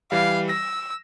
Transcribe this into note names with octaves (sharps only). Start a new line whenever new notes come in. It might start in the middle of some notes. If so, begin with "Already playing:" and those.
E3 G3 F5
E6 A#6